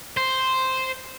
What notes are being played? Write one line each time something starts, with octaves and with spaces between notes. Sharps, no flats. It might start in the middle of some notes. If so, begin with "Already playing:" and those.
C5